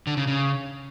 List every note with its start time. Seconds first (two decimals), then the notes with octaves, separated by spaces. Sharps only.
0.07 D3
0.17 C#3
0.27 C#3